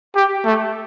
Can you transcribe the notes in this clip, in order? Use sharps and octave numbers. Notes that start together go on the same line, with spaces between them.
G4
A3